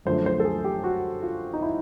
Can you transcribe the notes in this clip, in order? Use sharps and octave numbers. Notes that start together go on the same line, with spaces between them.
F#2 D3 F3 A3 C5
C5
A4
G#4
G4
F#4
F4
D#4
E4